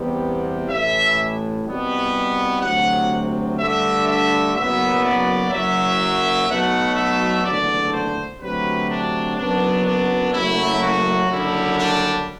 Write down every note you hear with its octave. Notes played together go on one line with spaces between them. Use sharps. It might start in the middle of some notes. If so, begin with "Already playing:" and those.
Already playing: E2 C3 G3 B3
A1 A2 E3 E5
C2 B2 G3 B3
D2 C3 F#3 F#5
G2 D3 A3 E5
E5
F#1 F#2 F#3 B3 E5
D5
F#1 F#2 F#3 E5
B1 B2 F#3 A3 F#5
E5
F#1 E2 D3 A3 D5
C5
D2 C3 F#3 B4
D4
F#1 F#2 F#3 B3 D4
D4
F#1 F#2 F#3 A3 E4
F#4
F#1 F#2 D3 G3 E4
D4